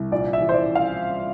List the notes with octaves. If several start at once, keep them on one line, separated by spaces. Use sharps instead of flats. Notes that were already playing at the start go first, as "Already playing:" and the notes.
Already playing: C2
A#1 D5
E5
E3
C5
D5
F5